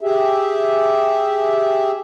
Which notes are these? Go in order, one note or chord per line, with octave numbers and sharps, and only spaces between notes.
G4 G#4 E5